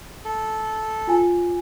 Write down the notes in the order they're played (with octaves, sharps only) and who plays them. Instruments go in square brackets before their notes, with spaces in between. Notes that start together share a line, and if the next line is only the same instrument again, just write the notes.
[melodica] A4
[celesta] F4 G#5